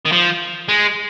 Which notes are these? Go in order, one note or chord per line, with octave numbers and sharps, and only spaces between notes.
D#3
F3
G#3